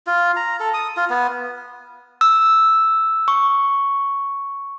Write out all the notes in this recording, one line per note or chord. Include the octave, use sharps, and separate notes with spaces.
F4
A#5
A4
D#6
F4
B3
E6
C#6